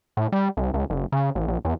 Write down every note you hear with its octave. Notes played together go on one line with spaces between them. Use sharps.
A2
G3
C2
C#2
F#1
C#3
A1
A#1
E2